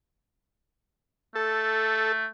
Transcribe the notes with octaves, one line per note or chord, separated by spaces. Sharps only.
A3 A4